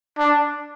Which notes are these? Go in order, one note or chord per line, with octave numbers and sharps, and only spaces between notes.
D4